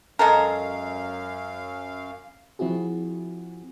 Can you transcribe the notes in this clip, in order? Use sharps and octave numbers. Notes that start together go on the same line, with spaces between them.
F#2 G#3 A4 A#4 F5
F3 C4 E4 F#4 G#4